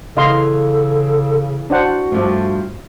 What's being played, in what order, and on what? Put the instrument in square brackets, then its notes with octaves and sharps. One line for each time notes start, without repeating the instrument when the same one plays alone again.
[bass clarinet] C#3 [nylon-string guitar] E3 [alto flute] A4 [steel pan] D#5 F5 C6
[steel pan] D4 C5 F#5 [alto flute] F#4
[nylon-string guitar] G2 F3 [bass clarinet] A3